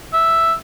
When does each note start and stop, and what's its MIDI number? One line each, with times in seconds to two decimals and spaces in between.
0.13 0.54 76